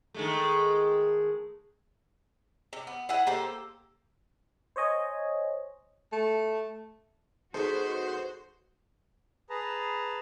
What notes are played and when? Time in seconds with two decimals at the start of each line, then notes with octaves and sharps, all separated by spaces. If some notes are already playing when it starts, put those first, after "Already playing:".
0.14 D#3 G#3 A3
2.73 C3
2.87 B3
3.09 E4 G#4 F#5
3.27 A#3 G4 A4 C5
4.76 C5 C#5 D#5 G#5
6.12 A3
7.54 G#3 B3 D#4 F#4 A4 C5
9.50 G#4 B4 A5 A#5